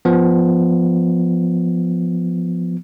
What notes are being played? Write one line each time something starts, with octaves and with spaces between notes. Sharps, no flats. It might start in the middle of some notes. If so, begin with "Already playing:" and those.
F3 B3